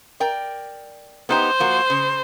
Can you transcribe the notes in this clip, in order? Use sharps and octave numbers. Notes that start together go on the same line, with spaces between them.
A#4 D5 G5
B3 D#4 G4 C5
F3 A#3 F#4
C#3